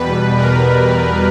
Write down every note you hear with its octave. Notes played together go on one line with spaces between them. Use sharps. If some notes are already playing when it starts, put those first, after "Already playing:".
Already playing: E2 B2 G3 B4
A#4